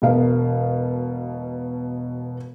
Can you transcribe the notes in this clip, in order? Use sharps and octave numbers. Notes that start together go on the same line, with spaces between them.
E1 B2 F5